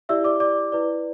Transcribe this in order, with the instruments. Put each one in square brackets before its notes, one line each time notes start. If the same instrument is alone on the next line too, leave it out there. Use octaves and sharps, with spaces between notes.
[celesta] E4 G4 D5 E5 E6
D5 D6
D5 D6
E4 B4 D5